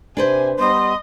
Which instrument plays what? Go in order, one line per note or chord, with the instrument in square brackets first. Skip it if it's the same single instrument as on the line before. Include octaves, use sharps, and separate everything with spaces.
[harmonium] C3 [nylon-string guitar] D4 B4 C5 [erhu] G#5
[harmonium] G3 B3 [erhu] D#5 [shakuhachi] C6